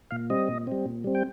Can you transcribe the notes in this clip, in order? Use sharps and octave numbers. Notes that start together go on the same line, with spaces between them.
A#2 F5
G3 C4 D#5
A#2
G3 C4
A#2
G3 C4
G5